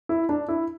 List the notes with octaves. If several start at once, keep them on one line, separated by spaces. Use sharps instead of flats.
E4
D4
E4